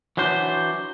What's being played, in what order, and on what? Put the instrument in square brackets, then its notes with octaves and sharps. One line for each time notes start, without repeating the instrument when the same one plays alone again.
[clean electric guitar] E3 F#3 D4 C5